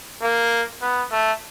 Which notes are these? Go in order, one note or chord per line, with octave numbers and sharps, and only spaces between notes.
A#3
B3
A3